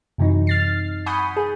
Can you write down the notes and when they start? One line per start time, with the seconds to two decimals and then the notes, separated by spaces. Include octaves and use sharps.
0.18 F#2 C3 E3 F#3 D#4
0.47 F6 A6 C7
1.06 F#5 G#5 B5 C#6 D#6 G6
1.37 G#4